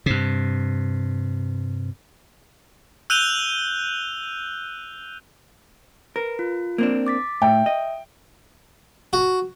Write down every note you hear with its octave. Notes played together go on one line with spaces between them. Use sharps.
G2 C3
E6 F#6 G6 D#7 F7 G7
A#4 B4
F4
A#3 C4 D4
D6 A6 B6
A2 E5 G5
D#5
F#4